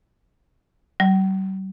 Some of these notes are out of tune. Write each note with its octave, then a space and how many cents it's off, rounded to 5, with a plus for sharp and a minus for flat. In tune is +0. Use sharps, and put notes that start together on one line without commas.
G3 -45